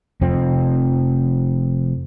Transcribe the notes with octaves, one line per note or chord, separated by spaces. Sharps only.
F1 F2 C4